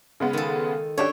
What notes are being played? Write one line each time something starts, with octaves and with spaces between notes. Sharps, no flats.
C#3 G#3 B3
D#3 A4
C#4 D4 G4 C#5 E5 G5